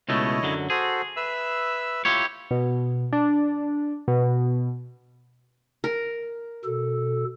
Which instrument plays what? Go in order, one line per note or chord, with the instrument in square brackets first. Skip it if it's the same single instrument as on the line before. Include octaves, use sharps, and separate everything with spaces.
[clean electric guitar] C#2 B2 A3 [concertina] E4 C#5 D#5
[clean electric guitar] F#2 D3 F#3
[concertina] F#4 A4 C5 [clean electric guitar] G#4
[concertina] B4 E5 E6
[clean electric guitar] E4 G4 C#5 [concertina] F4
[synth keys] B2
D4
B2
[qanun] A#4
[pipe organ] B2 A4